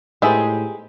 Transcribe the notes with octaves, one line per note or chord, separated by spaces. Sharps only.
A2 G#3 B3 D#4 G4 G#4 C5 E5